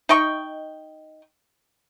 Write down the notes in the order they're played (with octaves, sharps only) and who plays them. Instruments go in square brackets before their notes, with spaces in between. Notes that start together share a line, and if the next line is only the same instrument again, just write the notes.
[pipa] D#4 D#5 G5 C#6